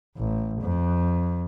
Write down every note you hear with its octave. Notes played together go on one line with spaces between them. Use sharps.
A1
F2